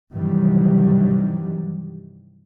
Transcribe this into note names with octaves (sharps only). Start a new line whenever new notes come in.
G2 C3 D#3 E3 F#3 G3